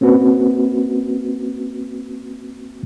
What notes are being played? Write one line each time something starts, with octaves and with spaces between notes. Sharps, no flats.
A#3 C4 C#4 F#4 B4